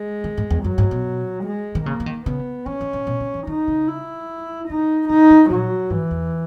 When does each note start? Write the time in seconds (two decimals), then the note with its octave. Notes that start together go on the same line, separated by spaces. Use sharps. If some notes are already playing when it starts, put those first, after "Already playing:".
Already playing: G#3
0.24 D#3
0.37 G#2
0.50 E2
0.64 F#2 F#3
0.78 G#2
0.91 B2
1.45 G#3
1.75 D#3
1.86 C#3 A#3
2.00 E3
2.06 D#3
2.26 C#3 B3
2.66 E3 C#4
2.81 D#3
2.93 C#3
3.07 B2
3.20 C#3
3.34 E3
3.47 D#3 D#4
3.68 C#3
3.88 E4
4.69 C#3 D#4
5.09 C#3 D#4
5.30 D#3
5.50 A#2 F#3
5.90 G#2 E3
6.11 E2